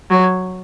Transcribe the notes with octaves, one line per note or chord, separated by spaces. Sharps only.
F#3